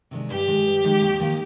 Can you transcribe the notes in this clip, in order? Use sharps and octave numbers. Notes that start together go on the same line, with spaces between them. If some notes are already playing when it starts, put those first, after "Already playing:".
C3 D#3 G#3 D4
G2 G4
D#3 G#3 D#4
G2
D#3 G#3 D#4
D#2
D#3 A#3